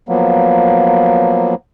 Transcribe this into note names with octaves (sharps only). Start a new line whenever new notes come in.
F3 F#3 A#3 B3